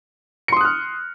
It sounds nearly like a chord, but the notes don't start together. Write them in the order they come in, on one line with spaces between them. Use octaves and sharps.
C#7 C6 D#6 F#6 F6